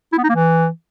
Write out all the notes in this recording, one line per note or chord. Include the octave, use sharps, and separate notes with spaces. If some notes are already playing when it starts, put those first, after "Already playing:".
E4
B3
D#4
A#3
E3